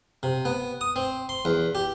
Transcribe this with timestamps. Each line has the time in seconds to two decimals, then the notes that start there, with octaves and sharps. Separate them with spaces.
0.23 C3
0.45 B3
0.81 D#6
0.96 C4
1.29 C6
1.45 E2
1.75 G4